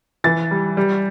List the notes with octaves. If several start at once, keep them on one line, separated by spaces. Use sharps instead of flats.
E3 A6
G3
G3